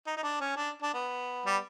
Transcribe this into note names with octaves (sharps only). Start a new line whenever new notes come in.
D#4
D#4
D4
C#4
D4
D4
B3
G3